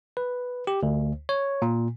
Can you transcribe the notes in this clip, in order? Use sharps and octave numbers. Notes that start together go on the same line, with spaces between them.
B4
G4
D2
C#5
A#2